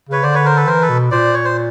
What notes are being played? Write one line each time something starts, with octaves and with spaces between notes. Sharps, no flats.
C#3 B4 C#5
D3 C5 D5
B4 C#5
A#4 C5
A4 B4
E3 A#4 C5
A4 B4
B2
A#2 C5 D5
C#5
C5